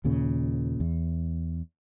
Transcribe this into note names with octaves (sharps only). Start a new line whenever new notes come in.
D#2 A#2 C#3
E2